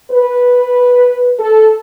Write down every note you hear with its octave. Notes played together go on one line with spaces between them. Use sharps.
B4
A4